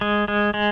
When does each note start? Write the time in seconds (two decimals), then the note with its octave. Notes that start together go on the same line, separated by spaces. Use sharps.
0.01 G#3
0.28 G#3
0.54 G#3